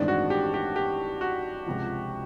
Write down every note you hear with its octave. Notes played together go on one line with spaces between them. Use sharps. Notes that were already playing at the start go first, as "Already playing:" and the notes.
Already playing: A1 G2 D#3 G#3 C4 D4
F#4
G4
G4
G4
F#4
C#2 C3 F3